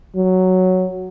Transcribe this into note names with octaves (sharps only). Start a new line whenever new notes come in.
F#3